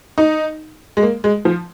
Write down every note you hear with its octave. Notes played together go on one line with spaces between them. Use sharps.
D#4
G#3
A#3
G#3
F3